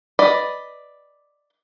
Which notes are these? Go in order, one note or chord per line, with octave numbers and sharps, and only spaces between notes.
B4 D5 D#5